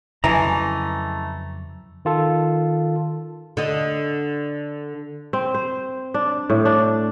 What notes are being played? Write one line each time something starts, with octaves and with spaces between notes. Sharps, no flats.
F2 C#3 E3 F#3 G#3 A3 A#5
D#3 F4 A4
D3 D#5
C4
C5
D4
A2
D4